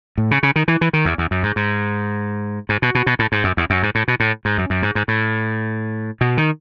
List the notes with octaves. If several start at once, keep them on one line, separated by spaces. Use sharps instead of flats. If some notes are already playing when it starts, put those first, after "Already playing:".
A2
C#3
C#3
D#3
E3
E3
D#3
E2
E2
F#2
G#2
G#2
G#2
B2
B2
B2
A2
G#2
F#2
E2
F#2
G#2
A2
B2
A2
G#2
F#2
F#2
G#2
G#2
A2
B2
D#3